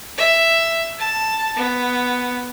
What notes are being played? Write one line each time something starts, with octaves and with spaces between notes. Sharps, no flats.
E5
A5
B3